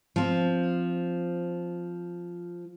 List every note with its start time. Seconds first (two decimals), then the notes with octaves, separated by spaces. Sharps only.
0.16 F3 C4